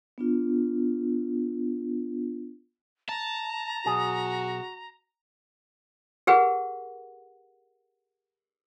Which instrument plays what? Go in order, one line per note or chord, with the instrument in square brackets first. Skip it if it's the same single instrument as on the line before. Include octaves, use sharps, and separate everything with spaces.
[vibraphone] B3 D4 F4
[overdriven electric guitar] A5 [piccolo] A#5
[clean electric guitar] B1 G#4 [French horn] F#4
[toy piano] G4 G#4 A#4 B4 F#5